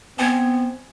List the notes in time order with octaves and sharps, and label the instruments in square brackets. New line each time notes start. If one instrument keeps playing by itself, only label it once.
[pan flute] B3 [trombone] C4 [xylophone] G#5 G#6